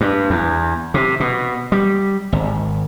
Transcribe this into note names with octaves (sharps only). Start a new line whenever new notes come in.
G2
E2
C3
B2
G3
G#1